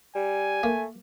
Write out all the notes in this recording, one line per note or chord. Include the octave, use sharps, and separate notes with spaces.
G3 G#5
A3 A#3